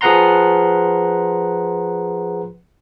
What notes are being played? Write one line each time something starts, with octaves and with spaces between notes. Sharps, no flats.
F3 G#4 B4 F#5 A#5 C6